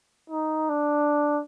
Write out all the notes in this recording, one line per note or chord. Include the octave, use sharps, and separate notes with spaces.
D#4
D4